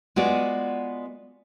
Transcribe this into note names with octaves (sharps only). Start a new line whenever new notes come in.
G#3 B3 F4 F#4 B4 D5